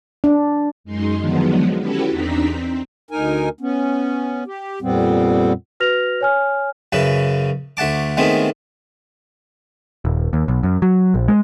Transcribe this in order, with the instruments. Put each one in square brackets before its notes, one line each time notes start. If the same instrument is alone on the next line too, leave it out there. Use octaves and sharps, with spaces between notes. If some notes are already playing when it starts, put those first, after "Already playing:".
[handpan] D4
[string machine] F#2 G#3 D#4 C6
D3 D#3 F3 F#3 G#3 B3
C#4 E4 F#4 G4 A4 B4
E2 C4 D4 D#4 A#5 B6
C4
[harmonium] D2 D#4 A#4 G#5
B3 C#4
G4
F2 A#2 G3 B3 C4
[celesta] F#4 B4 F6 A#6 F7
C#5 G#5 F6
[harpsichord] F#2 C#3 E4 B4
D2 A3 F#5 A5 D6
D#3 G#3 A3 B3 C4 E4
[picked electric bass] D#1
D#2
B1
F#2
F#3
A#1
G#3